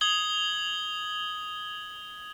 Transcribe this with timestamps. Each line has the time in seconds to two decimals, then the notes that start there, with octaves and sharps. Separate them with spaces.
0.01 D#6 G#6 F#7 G7